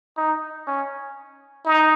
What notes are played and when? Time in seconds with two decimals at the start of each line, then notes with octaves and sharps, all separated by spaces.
0.17 D#4
0.67 C#4
1.65 D#4